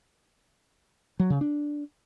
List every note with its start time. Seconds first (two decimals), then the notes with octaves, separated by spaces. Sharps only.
1.20 F#3
1.30 C#3
1.41 D4